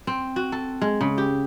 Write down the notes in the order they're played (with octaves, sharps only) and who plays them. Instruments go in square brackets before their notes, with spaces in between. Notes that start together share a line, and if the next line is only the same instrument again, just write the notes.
[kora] C4
F#4
A4
G#3
C#3
G4